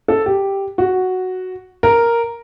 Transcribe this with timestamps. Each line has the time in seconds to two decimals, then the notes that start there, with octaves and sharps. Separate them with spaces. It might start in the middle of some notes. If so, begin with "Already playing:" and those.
0.08 A4
0.26 G4
0.78 F#4
1.83 A#4